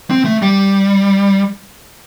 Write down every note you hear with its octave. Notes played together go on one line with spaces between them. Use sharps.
C4
A3
G3